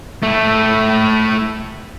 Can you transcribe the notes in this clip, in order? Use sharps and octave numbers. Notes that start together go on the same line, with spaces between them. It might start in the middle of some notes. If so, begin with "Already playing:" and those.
A3 E4